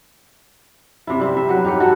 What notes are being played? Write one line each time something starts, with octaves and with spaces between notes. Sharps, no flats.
C3 E4
G3 C4 E4
E5
F#3 B4
D#4 G4 B4 C#5
D#4 F#4 A4